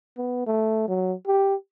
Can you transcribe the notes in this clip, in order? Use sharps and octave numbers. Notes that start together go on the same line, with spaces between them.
B3
A3
F#3
G4